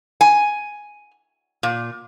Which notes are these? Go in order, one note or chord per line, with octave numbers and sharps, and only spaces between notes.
G#5
A#2